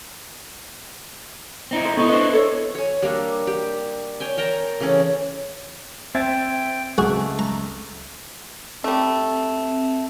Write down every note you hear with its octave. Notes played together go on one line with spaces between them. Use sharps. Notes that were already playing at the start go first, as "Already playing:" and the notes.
C4 D#4 E4
C5
B3 E4 A4 D#5 C#6
D4 B4 C5 D#5 E5
A4 C#5
C#5 G#5
G3 A#3 D4 A4
G4
C#5 G5 G#5
A#4 G5 A5 A#5
C#3 E3 A3 C#4
C4 E5 G5 G#6 A6
C#2 A3 F#4 G#4
A#5
G3 A3 C4